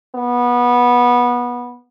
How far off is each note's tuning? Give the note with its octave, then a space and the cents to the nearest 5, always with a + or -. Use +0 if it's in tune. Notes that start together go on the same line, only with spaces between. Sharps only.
B3 -20